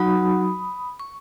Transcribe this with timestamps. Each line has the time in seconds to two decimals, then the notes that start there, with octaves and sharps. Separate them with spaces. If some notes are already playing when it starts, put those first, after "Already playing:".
Already playing: F#3 D#4 F#4 B5 D#6
1.00 C#6